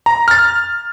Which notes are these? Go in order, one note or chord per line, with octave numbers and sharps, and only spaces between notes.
A#5
F6 A6